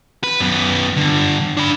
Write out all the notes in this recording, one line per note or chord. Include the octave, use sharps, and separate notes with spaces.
B4
F#2 B3
G2 D3
D4 B5